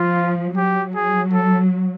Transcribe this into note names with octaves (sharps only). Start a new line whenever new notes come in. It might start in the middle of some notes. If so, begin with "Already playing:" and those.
Already playing: F3 F4
F#3 G4
G#4
A4